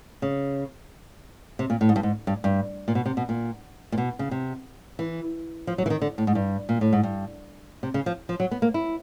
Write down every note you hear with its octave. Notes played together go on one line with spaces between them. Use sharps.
C#3
C3
A#2
A2
G#2
G2
G#2
G2
G2
A#2
B2
C3
B2
A#2
A#2
B2
C#3
C3
E3
F3
F#3
E3
D#3
D3
A2
G#2
G2
A#2
A2
G#2
G2
C3
C#3
F3
F3
F#3
B3
A#3
E4